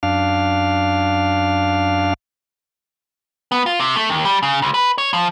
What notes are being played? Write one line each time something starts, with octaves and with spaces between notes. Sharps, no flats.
F#2 D4 F5
B3
F4
C3
A3
D#2
G3
C#3
C#2
B4
C#5
F3